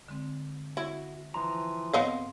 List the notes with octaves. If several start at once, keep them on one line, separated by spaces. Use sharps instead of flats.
D3 G#3 C4
E4 F#4
E3 F3 A#5 C6
G#2 B3 C4 D#5 F5